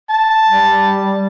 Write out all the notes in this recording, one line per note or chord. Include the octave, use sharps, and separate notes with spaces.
A5
G3